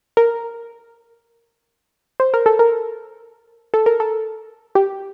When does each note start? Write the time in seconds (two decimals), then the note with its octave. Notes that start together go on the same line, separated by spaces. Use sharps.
0.17 A#4
2.20 C5
2.34 A#4
2.46 A4
2.59 A#4
3.74 A4
3.86 A#4
4.00 A4
4.75 G4